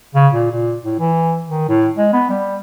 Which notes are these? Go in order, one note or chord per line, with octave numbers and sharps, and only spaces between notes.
C#3
A#2
A#2
A2
E3
D#3
A2
G#3
B3
G3